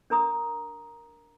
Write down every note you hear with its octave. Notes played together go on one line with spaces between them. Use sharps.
D4 A#4 A#5 D#6